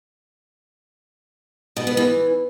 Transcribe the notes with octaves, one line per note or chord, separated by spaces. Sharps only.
B2
B3
E3